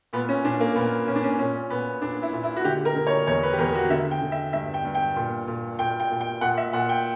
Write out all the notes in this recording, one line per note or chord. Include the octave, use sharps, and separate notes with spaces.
A#2 B3
C#4
A#2 D4
A#3
A#2 B3
A#2 C#4
D4
C#4
A#2 C#4
A#2 B3
A#2 D4
E4
A#2
E4
F#4
D3 G4
A#4
D3
C#5
E2 C#5
B4
G4
E2 A#4
F#4
D3 E5
G5
D3
E5
G2 E5
G5
G2
G5
A#2
A#2
A#2 G5
G5
A#2
G5
A#2 F#5
E5
A#2 F#5
G5